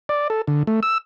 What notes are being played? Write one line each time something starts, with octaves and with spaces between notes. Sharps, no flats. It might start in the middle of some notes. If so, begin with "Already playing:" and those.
D5
A4
D3
A3
E6